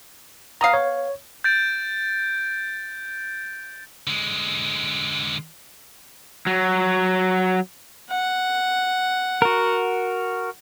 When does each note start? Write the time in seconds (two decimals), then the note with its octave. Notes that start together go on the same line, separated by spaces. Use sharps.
0.61 B3 F5 A#5 D#6 C7
0.73 C#5
1.44 G6 A6 D7
4.07 D3 G#3
6.47 F#3
8.10 F#5
9.42 F#4 A#4